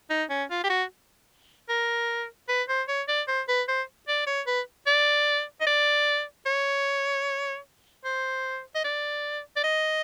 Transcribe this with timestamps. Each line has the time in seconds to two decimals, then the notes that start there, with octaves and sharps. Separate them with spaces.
0.10 D#4
0.30 C#4
0.50 F4
0.64 G4
0.69 F#4
1.69 A#4
2.49 B4
2.68 C5
2.88 C#5
3.08 D5
3.28 C5
3.48 B4
3.68 C5
4.08 D5
4.27 C#5
4.47 B4
4.87 D5
5.60 D#5
5.67 D5
6.46 C#5
8.04 C5
8.75 D#5
8.84 D5
9.56 D5
9.64 D#5